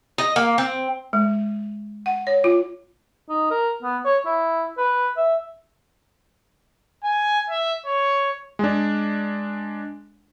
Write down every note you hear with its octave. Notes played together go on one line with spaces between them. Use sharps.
D#5
A#3
C4
G#3
F#5
C#5
F4
D#4
A#4
B3
C#5
E4
B4
E5
G#5
E5
C#5
G#3 D4